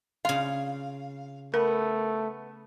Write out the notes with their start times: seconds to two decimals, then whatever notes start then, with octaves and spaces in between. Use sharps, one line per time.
0.25 C#3 F4 F5
1.54 A3 B3 A#4